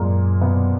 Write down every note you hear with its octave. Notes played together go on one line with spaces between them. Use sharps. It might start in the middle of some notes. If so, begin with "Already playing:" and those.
Already playing: F#2 A#2 G#3 A#3
B2 B3